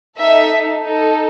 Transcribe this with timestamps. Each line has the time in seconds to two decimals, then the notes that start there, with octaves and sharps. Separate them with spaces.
0.19 D#4 A4 E5
0.82 D#4
0.87 A4